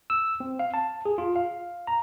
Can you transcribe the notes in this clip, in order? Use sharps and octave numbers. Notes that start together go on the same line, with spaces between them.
E6
C4
F5
A5
G#4
F4
F5
A#5